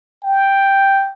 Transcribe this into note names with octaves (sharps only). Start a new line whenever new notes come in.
G5